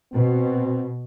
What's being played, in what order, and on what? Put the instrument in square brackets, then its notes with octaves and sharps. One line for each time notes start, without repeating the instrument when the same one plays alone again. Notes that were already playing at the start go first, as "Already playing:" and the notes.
[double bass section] B2 [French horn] C4